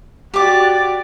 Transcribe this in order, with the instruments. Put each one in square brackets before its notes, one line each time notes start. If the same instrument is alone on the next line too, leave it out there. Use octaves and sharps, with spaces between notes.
[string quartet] F#4 D5 A6 [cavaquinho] G4 D6